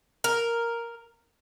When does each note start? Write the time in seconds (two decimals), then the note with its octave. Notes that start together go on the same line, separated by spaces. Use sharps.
0.24 A#4